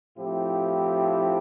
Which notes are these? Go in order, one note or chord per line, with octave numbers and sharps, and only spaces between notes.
A2 F3 C4 E4 G4